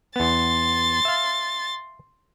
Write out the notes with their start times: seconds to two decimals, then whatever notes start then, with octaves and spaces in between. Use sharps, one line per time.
0.16 E2 B3 C6 A6
1.05 E5 F5